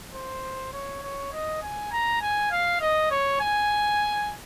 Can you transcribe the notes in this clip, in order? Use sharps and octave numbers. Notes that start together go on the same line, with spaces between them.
C5
C#5
C#5
D#5
G#5
A#5
G#5
F5
D#5
C#5
G#5